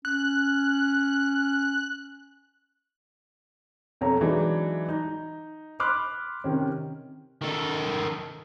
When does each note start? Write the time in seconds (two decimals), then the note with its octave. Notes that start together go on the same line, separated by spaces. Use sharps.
0.05 C#4 F#6
4.01 B1 F2 C#5 A#5
4.21 E3 F#3 G#3 D4 D#4
4.89 D#4
5.80 B5 C6 D6 F6 F#6
6.44 C3 D#3 C#4
7.42 D#3 A4